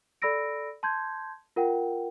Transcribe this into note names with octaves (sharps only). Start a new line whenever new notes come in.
A4 D5 B5 E6 A#6 D7
A5 C6 G6 G#6
F4 A#4 F#5 G5